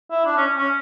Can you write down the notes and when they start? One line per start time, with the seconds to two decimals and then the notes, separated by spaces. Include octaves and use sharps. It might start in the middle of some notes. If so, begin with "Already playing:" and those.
0.10 E4
0.26 D4
0.37 C#4
0.58 C#4